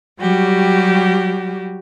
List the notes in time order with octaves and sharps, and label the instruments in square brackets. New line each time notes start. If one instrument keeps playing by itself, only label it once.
[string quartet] F#3 G3 F#4 G4